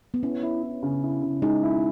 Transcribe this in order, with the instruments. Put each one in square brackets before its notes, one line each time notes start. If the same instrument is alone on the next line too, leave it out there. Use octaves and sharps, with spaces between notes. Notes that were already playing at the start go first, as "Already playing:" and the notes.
[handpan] B3
[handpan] C#4 [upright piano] E4
[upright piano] E4
E4
C#3
E4
C#3
[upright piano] G#3 [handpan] D#4
[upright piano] E4